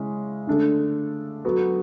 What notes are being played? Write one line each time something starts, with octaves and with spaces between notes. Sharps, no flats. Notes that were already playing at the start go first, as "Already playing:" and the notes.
Already playing: C#3 G#3 C#4 E4
D3 A3 D4 A4
F#3 B3 F#4 A4